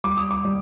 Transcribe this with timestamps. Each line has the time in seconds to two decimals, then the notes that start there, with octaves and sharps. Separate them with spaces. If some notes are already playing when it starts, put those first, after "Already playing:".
0.04 G3 D6
0.17 D#6
0.31 D6
0.45 G3